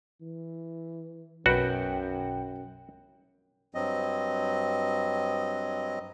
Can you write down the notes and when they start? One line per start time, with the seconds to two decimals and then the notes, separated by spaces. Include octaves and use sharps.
0.22 E3
1.46 B1 F#2 F#4 B4 G5
3.75 G2 F#3 C4 D#5